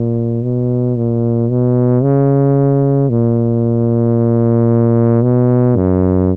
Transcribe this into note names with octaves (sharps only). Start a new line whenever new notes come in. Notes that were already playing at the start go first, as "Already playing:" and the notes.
Already playing: A#2
B2
A#2
B2
C#3
A#2
B2
F#2